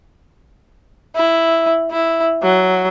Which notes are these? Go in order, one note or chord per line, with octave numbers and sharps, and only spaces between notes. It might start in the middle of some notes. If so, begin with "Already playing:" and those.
E4
E4
F#3